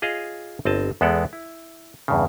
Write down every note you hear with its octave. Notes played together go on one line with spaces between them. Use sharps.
F4 G#4 C#5 D#5 F5
G1 C4 D#5 A5
E2 G#3 B3 A4 D5
E4
E2 G2 C#3